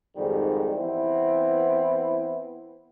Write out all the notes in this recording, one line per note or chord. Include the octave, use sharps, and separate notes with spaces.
F2 G#2 D#3 G3
E3 B3 C4 E4